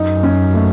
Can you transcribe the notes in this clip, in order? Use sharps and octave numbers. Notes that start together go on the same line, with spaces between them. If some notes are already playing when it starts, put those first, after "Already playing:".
Already playing: F#2 D#4
C#4
A3